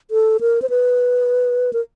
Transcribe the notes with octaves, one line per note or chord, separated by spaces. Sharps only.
A4
A#4
C5
B4
A#4